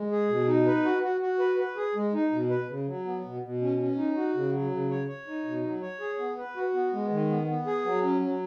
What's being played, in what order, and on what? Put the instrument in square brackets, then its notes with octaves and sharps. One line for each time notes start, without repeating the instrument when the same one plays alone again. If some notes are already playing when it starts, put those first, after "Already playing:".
Already playing: [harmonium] G#3
G#4
B2
D#4
B4
F#4
F#4
F#4
B4
B4
G#4
G#3
D#4
B2
B4
C#3
F#3
B3
B2
B2
C#4
C#4
D#4
F#4
C#3
F#3
C#3
C#5
C#5
D#4
B2
F#3
C#5
G#4
B3
B4
F#4
B3
G#3
D#3
B3
B3
G#4
F#3
C#4
F#3